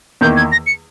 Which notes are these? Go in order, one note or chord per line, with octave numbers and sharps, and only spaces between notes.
E2 D#3 A#3 G6
G#6
A#6
C#7